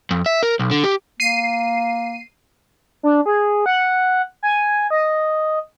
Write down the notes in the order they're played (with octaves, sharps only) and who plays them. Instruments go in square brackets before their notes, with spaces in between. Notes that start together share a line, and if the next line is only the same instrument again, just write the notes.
[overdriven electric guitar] F2
E5
A#4
B1
D3
G4
[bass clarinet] A#3 [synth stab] C7 D#7
[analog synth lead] D4
G#4
F#5
G#5
D#5